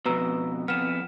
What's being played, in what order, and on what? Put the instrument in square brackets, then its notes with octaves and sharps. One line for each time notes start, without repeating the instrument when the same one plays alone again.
[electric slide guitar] F2 B2 [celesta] B4 A#5 E6
[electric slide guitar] F2 B3 [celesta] F6 E7